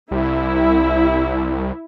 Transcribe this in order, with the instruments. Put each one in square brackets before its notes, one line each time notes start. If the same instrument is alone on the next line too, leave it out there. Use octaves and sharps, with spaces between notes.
[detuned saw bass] C2 [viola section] E4